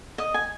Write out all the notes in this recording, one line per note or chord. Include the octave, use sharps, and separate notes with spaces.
D#5
G#5